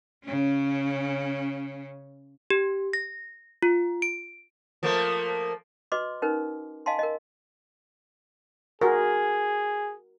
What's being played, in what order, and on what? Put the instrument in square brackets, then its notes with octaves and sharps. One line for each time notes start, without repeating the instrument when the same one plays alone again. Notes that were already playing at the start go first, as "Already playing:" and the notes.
[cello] C#3 C#4
[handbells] G4
A#6
F4
D7
[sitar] F3 A3 A#3
[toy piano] F#4 B4 D#5 C6 D6
C#4 D#4 A#4 B4
D#5 F5 G#5 A5 C6
A#4 D#5
[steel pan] F#4 A#4 [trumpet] G#4